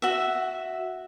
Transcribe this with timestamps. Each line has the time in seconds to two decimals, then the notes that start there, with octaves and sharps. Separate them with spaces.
0.02 F#4 E5